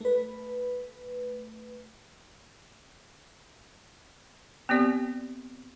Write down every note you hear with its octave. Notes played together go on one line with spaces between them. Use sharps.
A3 B4
B3 C4 G4 D5